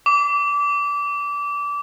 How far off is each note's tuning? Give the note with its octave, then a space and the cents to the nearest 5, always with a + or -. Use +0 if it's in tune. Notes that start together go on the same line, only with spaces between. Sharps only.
D6 -25